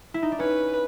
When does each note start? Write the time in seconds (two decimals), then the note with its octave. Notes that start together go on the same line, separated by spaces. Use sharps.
0.14 E4
0.22 D#4
0.32 D4
0.40 C#4 B4